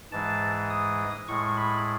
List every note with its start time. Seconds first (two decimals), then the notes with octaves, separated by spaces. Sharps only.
0.12 G#2 E3 G#3 A5
0.70 D#6
1.28 A2 G#3 C#6
1.57 B5